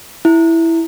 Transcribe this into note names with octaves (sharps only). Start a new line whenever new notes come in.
E4